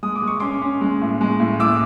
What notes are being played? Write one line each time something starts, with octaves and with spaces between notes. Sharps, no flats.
G#3 D#6
D6
G#3
C#6
C#4 C6 D6
C#4
G#3
A2
G#3
A2
A2 D6 E6